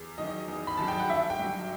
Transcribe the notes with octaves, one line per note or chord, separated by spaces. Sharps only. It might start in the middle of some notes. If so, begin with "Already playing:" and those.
Already playing: E2
D#3 F#3 D#5
E2
B5
D#3 F#3 A5
G5
F#5
G1 E5
G5
G2 F#3